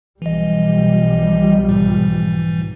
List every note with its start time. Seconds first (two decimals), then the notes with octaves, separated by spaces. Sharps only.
0.22 B1 E3 F3 G3 D#5
1.69 G#2 E3